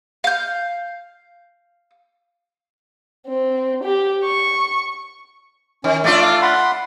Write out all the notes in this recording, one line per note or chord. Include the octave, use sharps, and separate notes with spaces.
F5 G6
C4
G4
C#6
D#3 C#4
A3 D4 F4 D5
F5 D6
F#5 B5 C6